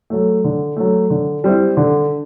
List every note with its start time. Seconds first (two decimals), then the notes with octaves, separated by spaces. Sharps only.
0.10 F#3 A3
0.44 D3
0.76 F#3 A3
1.10 D3
1.44 G3 C4 E4
1.77 D3